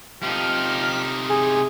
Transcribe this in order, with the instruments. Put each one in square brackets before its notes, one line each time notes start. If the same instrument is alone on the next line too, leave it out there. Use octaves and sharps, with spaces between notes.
[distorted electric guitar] C3 D#4 [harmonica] F3 G4 F6
[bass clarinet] G#4